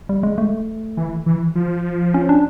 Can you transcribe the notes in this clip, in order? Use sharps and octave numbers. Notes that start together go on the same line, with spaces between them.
G3
G#3
A3
E3
E3
F3
C#4
D4